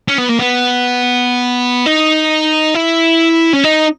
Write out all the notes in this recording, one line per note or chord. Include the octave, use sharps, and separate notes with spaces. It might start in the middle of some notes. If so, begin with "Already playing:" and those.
C#4
B3
A#3
B3
D#4
E4
C#4
D#4